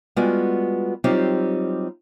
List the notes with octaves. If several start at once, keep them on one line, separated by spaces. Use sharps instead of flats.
G3 G#3 B3 F4 F#4
F#3 G3 C4 D#4 F4 G4